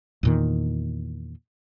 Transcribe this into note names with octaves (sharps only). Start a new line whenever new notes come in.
E2 A#2 D#3